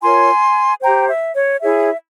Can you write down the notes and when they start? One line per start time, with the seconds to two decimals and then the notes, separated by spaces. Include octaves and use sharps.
0.02 F4 A#4 C#5 G#5 C6
0.82 G4 C5 G5 A#5
1.08 E5
1.35 C#5
1.61 E4 G#4 C#5 E5